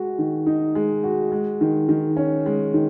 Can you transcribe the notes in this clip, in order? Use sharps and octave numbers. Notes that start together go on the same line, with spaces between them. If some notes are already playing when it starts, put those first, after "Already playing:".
Already playing: G#3 F#4
D#3
D#4
G#3
F#4
G#3
D#3
D#3
C#4
G#3
D#3